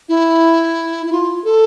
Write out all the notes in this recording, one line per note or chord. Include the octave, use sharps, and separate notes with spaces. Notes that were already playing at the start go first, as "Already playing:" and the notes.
E4
E4
F4
A4